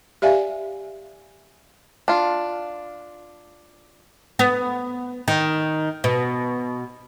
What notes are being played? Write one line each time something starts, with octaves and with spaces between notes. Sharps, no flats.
G4 D5 E5 F5 G#5
D4 F4
B3
D#3
B2